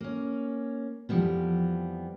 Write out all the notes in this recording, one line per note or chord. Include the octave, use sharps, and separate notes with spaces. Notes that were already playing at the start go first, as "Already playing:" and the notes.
A#3 C#4
F2 E3 F3 G3 A#3 B3